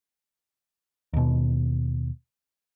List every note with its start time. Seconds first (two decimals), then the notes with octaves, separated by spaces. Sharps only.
1.13 D#2 B2